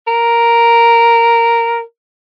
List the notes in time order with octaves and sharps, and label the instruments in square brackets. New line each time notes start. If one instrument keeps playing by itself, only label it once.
[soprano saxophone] A#4